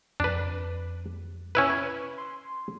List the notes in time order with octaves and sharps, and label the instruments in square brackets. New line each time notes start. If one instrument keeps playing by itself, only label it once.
[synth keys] F2 [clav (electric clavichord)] D4 B4
[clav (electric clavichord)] C#4 E4 B4
[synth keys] C6